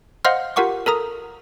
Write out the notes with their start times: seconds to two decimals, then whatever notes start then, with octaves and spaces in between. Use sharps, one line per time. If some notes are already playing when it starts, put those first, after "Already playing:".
0.25 C5 D#5 F5 F#5 C6 F6
0.56 F4 G4 A#4 F#5 C#6 D6
0.86 A4 A#4 A#5 D#6